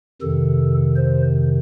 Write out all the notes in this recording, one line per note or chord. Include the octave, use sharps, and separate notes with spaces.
F2 C3 D#3 A4
C5